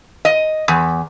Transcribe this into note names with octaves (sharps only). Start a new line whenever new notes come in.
D#5
E2